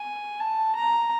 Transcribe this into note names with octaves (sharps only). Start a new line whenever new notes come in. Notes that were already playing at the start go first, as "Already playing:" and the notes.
Already playing: G#5
A5
A#5